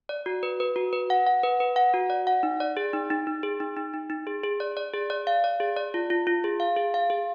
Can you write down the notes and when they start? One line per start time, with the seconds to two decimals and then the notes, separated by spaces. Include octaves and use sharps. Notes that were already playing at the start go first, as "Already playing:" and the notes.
0.09 D5
0.26 F#4
0.43 B4
0.60 B4
0.76 F#4
0.93 B4
1.10 F#5
1.27 F#5
1.43 B4
1.60 B4
1.76 F#5
1.94 F#4
2.10 D5
2.27 F#5
2.43 D#4
2.60 D5
2.77 G#4
2.93 D#4
3.10 D#4
3.27 D#4
3.43 G#4
3.60 D#4
3.76 D#4
3.94 D#4
4.10 D#4
4.27 G#4
4.44 G#4
4.60 D5
4.77 D5
4.94 G#4
5.10 D5
5.27 F5
5.44 D5
5.60 G#4
5.76 D5
5.94 F4
6.10 F4
6.27 F4
6.44 G#4
6.60 F5
6.76 G#4
6.94 F5
7.10 G#4